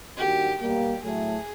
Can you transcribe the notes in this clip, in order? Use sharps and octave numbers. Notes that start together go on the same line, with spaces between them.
D#3 G3 A#3 D4 F#4 G4
B2 G3 A#3 G4
A2 F#3 A3 G#4